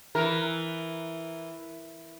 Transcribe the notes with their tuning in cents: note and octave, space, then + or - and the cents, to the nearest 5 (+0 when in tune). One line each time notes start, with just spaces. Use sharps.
E3 +0 A#4 +0